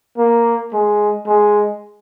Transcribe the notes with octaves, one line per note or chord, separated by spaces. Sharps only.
A#3
G#3
G#3